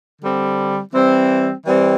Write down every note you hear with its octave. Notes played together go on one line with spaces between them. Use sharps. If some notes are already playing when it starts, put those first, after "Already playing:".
D3 G3 C4
E3 G3 C4
E3 G3 C4